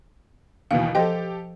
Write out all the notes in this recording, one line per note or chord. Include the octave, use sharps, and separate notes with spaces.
D#2 B2 E3 F5
F3 G4 A4 D#5 G5